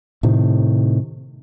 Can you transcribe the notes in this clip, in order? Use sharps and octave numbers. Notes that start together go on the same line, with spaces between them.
A2 C3 D#3